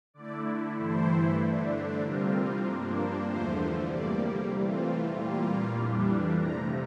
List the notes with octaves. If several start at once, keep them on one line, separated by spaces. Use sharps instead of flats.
D3 A3 E4 D5
G2 E3 A3 E4 C5
D3 A3 D4
C3 G3 C4 F4 A#4
G2 F3 A#3 D4 A#4
C5
E2 D3 F3 A3 C5
C3 G3 A#3 D5
E3 A3 C4 F4
A#2 G3 A#3 F4
F2 E3 G3 D4
C3 F3 A3 A#5